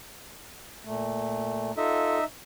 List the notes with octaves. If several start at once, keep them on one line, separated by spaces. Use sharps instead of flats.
A#2 A3
D#4 F4 A4 E5